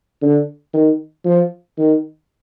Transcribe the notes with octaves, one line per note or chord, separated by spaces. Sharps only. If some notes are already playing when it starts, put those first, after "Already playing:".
D3
D#3
F3
D#3